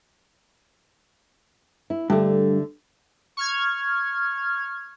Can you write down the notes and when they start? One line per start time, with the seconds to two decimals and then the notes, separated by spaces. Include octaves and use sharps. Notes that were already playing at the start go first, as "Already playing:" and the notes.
1.90 E4
2.10 G2 D3 A3
3.37 C#6 F6 G#6